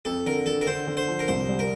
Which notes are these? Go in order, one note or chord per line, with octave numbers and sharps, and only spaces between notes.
F2 A4
D3 A#4
D3 A4
A#4
D3 C5
D3
C5
F3
A#4
C2 C5
G3
A#4